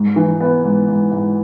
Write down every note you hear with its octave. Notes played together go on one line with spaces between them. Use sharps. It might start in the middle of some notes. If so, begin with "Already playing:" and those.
Already playing: G#2
E3
B3
G#2
G#2
G#2